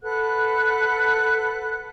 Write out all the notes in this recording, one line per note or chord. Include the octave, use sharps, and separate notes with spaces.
A4 B4 F#5 F#6